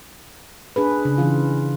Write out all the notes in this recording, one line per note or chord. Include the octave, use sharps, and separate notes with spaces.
D4 G#4 B4
C#3
E3 F4